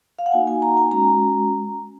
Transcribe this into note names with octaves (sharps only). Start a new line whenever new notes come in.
F5
F#5
A#3 D#4 F#4 G#5
G#5
A#5
G#5
G#3 C#4 F#4 A#5